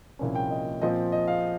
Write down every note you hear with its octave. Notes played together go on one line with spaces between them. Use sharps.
C2 A#2 F3 A#3 C#4
G5
D#5
A#2 F3 C4 D#5
D#5
F5